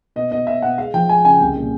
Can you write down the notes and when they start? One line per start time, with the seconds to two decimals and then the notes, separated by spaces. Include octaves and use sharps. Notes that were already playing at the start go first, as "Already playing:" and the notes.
0.16 B2 D#5
0.31 B2 D#5
0.47 B2 E5
0.62 B2 F#5
0.78 G#3 F5
0.94 F3 G5
1.09 G#3 G#5
1.25 C#3 G#5
1.40 C2 G5
1.56 A#2